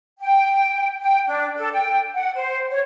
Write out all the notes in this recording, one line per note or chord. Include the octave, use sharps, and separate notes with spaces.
G5
G5
D4
A4
G5
F#5
C5
C#5